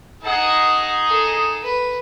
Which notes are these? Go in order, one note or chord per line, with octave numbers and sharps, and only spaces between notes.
D#4 G#4 F#5 A5
A4
B4